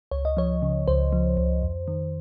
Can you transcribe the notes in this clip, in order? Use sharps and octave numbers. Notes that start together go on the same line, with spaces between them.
C#2 C#5
D#5
F3 C#5
C#3
C#2 C5
F3
C#2
F2
D#3